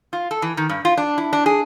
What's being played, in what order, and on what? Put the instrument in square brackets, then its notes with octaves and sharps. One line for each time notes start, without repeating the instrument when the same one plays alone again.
[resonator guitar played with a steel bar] F4
A4
E3
D#3
G2
F4
D4
E4
D4
G#4